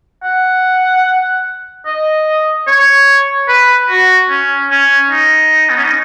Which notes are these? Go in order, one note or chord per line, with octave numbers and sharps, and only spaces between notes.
F#5
D#5
C#5
B4
F#4
C#4
C#4
D#4
B3
C#4
D#4